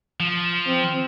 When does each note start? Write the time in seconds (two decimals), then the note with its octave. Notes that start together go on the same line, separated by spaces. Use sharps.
0.20 F3
0.67 C4